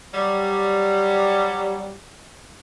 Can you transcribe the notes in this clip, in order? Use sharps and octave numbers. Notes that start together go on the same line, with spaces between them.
F#3 G3